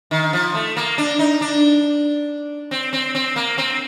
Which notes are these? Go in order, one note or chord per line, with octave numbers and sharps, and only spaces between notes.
D#3
F3
A3
A#3
D4
D#4
D4
C4
C4
C4
A#3
C4